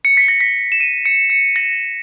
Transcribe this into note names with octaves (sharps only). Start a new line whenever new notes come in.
C#7
B6
A#6
B6
E7
D#7
C#7
C#7
A#6